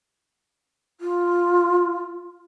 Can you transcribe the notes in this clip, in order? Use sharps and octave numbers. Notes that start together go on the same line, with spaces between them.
F4